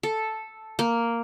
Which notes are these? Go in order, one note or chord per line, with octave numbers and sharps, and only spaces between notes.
A4
A#3